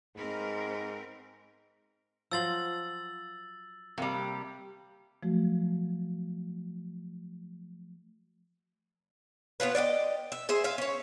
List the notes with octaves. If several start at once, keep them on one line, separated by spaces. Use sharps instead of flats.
G#2 C4 A#4 B4
F3 F#3 F4 E6 A6 F#7
C3 G3 A#3
F3 F#3 A3 F#4
B3 C#4 F4 B4
D5 D#5 F5 G5
E5
G#4 C5 E5
E5 F5 G#5
C#4 C#5